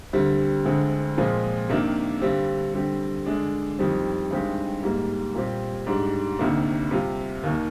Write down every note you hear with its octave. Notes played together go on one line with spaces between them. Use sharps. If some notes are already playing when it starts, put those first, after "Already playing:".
D2 D3 G3 C4
D2 D3 G#3 C4
A#2 F3 G#3 C4
C3 D#3 A#3 D4
G2 D3 G3 C4
D3 G3 C4 G4
D3 G#3 D4
F2 D#3 G3 C4
G2 D#3 G#3 C4 G4
G#2 G3 A#3
A#2 G3 C4 G4
G#2 G3 D4
D2 C3 D#3 A#3 D4
C3 G3 C4 F4
D#2 D#3 A#3